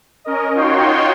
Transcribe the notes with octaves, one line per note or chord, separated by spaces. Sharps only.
C#4 A#4 D#5
D#4 F4 F#4 C#5 G5 C6